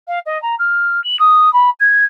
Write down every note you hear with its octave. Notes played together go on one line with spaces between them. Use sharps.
F5
D#5
A#5
F6
F#7
D#6
B5
G#6